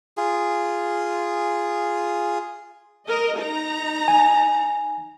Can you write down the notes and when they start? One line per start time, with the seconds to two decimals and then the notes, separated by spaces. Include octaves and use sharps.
0.17 F4 G#4
3.08 A#4 D#5
3.39 D#4 A#5
4.08 G#5